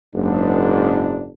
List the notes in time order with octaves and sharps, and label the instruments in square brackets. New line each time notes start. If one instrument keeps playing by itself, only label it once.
[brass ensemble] F#1 G#2 D4